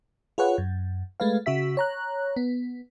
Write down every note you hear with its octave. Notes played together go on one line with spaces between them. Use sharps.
F4 G#4 B4 C#5 F#5
F#2
G#3 A3 B4 F5
C#3 F#4 E5 B6
C#5 A#5 F#6
B3